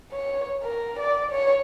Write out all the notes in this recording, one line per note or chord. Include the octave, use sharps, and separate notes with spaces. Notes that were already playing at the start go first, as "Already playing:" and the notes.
C#5
A#4
D5
C#5